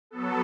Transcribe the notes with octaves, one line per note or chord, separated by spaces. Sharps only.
F#3 B3 A4